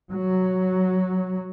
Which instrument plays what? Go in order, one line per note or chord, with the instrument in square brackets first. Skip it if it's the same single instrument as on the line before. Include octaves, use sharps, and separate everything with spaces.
[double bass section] F#3